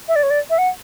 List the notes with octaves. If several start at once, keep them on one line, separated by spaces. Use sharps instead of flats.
E5
D5
C#5
D5
E5
F#5